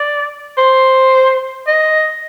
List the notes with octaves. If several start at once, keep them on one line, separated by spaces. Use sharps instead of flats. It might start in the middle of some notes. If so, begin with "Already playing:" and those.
Already playing: D5
C5
D#5